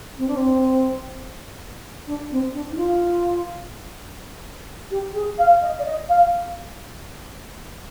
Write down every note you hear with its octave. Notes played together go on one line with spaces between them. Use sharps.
C4
D4
C4
D4
C4
D4
D#4
F4
G4
G#4
F5
D#5
D5
D#5
F5